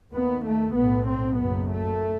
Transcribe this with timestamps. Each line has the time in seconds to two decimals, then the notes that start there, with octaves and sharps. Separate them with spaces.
0.12 D#2 B3
0.44 A3
0.74 B1 A2 B3
1.06 C4
1.38 F#1 F#2 B3
1.69 A3